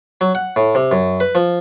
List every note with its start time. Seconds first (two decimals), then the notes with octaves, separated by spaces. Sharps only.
0.21 F#3
0.35 F#5
0.56 A2
0.75 C3
0.92 F#2
1.20 B4
1.35 F3